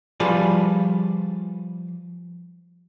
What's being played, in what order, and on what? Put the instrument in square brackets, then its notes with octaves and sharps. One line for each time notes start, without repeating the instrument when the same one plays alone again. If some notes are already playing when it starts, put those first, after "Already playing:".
[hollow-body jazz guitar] F3 G3 F4 G#4 B4 D5